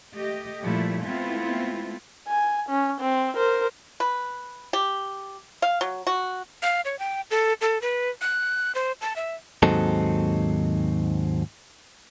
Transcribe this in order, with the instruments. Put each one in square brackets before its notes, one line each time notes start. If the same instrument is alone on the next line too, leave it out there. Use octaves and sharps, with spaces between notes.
[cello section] A3 G4 D#5
A#2 F3 G3 A3 E4
G#3 A3 B3 C4 E4 F4
[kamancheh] G#5
C#4
C4
A#4 C5
[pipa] B4
G4
F5
F#3
F#4
[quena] F5
C#5
G5
A4
A4
B4
F#6
C5
A5
E5
[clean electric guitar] D#2 G#2 F#3 C4 D#4 A4